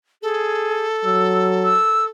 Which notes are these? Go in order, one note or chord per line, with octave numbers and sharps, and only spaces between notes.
G#4 A4
F#3 E6
E6